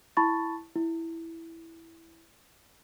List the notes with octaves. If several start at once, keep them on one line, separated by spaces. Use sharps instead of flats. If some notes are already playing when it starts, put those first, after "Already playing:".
E4 A5 B5 C#6 A6
E4